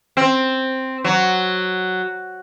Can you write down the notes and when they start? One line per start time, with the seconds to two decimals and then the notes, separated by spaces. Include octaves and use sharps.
0.17 C4
1.04 F#3